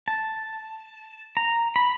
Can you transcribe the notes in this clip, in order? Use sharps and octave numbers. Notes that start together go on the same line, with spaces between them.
A5
A#5
B5